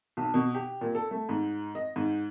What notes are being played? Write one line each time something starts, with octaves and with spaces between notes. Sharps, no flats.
B1
B2
G4
A#2
A4
A3
G#2
D#5
G#2